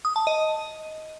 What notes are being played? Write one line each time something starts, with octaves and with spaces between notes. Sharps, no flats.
D#6
A5
D#5